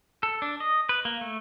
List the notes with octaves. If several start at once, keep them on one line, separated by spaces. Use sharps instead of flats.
A4
D4
D#5
B4
A#3
A3